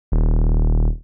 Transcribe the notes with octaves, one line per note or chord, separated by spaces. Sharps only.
D#1